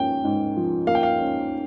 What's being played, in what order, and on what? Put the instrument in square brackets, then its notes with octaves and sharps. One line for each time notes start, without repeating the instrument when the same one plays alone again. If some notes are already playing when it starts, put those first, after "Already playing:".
Already playing: [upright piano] G#2 F3 A#3 C#4 [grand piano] G5
[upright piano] G#2
F3
[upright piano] A#3 [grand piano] F5
[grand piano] G5
F5
[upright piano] C#4